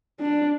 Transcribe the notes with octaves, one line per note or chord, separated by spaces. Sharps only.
D4